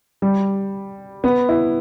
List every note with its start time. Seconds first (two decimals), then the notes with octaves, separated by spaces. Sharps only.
0.22 G3
1.24 B3
1.49 E4